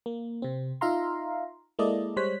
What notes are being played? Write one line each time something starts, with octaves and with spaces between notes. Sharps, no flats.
A#3
C3 C4
D#4 F4 E5 F5 A#5 C6
G#3 A#3 E4 A4 D5 D#5
G3 G#3 C5 C#5 F#6 B6